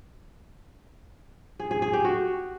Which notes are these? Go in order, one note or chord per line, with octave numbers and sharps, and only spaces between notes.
G#4
G#4
G#4
G4
F#4